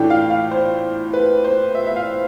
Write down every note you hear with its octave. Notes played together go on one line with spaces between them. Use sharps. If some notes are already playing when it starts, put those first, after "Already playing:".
Already playing: A2 E3 A3 D4 G5
F5
F5
C5
B4
C5
E5
E5
F5